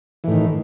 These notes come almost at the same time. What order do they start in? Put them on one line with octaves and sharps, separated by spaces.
E3 A2 D#3